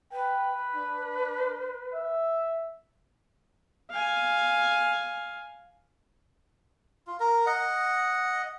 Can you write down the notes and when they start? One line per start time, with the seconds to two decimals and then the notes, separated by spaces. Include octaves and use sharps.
0.12 B4 G5
0.76 D4
1.94 E5
3.91 F5 G#5
7.07 F4
7.20 A#4
7.46 D#5 F#5